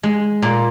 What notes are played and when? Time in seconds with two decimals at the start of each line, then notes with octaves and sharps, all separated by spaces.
0.03 G#3
0.42 A#2